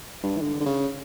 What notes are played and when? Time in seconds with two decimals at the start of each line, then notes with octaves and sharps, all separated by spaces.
0.23 G2
0.37 E3
0.41 D3
0.60 D3
0.66 C#3